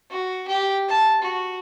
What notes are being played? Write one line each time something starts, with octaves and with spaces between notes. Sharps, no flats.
F#4
G4
A5
F#4